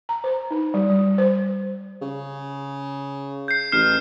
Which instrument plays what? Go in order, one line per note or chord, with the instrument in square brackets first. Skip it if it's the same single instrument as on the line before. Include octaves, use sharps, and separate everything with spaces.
[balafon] A#5
C5
D#4
G3
G3
C5
[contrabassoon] C#3
[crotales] G6 C7
[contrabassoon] A1 [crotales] F6 C7 E7